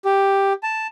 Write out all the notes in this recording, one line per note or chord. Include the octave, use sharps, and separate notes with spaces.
G4
A5